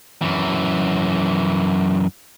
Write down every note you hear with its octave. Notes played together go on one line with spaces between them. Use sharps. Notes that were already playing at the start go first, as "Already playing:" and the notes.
F#2 E3